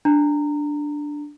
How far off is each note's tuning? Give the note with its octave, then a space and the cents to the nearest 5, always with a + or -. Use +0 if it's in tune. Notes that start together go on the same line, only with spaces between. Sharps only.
D4 +0 A#5 -20